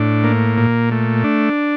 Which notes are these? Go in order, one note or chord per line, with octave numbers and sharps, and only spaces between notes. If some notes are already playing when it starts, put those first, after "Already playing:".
Already playing: A2 D4
A#3
A#2
A3
D4